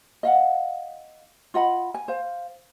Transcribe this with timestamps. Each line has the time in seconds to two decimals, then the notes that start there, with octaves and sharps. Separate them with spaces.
0.23 D#5 F5 F#5
1.54 F4 D#5 F#5 B5
1.94 G#5
2.08 C5 F5